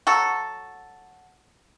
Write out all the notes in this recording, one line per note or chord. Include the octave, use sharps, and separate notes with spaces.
F#3 F#4 A4